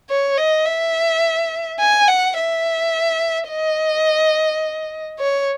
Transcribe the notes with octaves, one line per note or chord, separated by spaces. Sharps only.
C#5
D#5
E5
G#5
F#5
E5
D#5
C#5